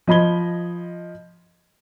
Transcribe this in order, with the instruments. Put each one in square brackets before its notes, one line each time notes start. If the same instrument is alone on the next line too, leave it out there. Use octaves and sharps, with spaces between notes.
[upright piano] F3 D#5 B5 G#6 G7